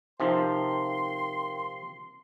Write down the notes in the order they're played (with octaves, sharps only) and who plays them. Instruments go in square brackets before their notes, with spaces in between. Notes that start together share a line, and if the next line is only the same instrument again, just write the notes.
[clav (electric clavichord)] C3 F3 [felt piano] D#4 [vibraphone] A#4 F5 G5 [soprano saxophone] C6